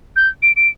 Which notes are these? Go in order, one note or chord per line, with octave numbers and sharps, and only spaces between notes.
G6
D7
D7